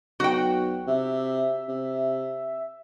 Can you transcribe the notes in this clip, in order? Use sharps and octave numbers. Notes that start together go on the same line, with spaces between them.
B1 F#4 G5
C3 E5
C3